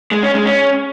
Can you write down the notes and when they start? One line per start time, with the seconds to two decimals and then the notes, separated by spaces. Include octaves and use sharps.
0.11 G#3
0.23 C#4
0.34 G#3
0.46 C#4